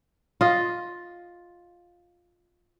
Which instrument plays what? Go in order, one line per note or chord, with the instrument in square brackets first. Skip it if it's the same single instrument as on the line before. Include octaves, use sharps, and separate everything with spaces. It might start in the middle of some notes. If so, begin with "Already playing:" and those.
[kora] F4 D#5